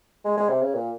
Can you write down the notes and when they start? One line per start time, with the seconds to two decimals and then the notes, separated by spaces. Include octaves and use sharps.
0.25 G#3
0.37 G#3
0.49 C3
0.62 C#3
0.75 A#2